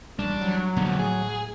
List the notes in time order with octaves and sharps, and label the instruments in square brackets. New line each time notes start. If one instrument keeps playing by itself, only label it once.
[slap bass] A1 G3 [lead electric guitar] D4
[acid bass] F#3
[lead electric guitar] F2 D3 [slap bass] A#2 D#3 B3
[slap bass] A2 [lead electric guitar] G#4